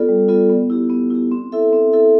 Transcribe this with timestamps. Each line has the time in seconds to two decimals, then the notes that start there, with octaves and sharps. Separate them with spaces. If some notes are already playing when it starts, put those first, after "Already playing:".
Already playing: B3 F4 A4 D5
0.09 G3
0.29 B3 F4 A4 D5
0.50 B3
0.70 E4 G4
0.90 B3
1.10 E4 G4
1.32 C4
1.52 E4 A4 E5
1.73 C4
1.93 E4 A4 E5